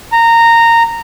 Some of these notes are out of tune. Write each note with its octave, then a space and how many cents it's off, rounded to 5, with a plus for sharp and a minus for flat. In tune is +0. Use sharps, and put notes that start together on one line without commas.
A#5 -15